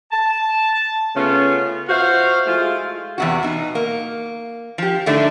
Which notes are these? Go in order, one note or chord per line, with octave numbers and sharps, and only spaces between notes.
A5
C#3 A3 B3 C#4 F4
F4 F#4 C5 E5 F5
G#3 A3 E4 F4 G#4
E2 C3 F#4
B2 D#4
A#3
F3 G4
A2 D3 A3 D4 D#4